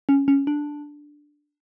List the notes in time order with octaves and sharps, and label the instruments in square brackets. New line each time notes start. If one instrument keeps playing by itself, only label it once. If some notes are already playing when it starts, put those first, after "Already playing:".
[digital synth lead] C#4
C#4
D4